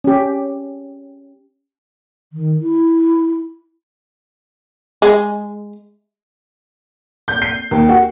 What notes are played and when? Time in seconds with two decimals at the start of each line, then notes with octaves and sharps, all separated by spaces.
0.04 C#4 G4
2.33 D#3
2.62 E4
5.02 G#3
7.28 G6
7.42 C7
7.71 D#2
7.89 F#4